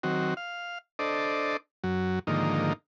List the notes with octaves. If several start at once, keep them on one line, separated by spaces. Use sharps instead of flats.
D#3 F#3 C4 F#4
F5
D4 A4 C5 D5 D#5
F#2 F#3
G#2 D3 D#3 F3 A#3 D#4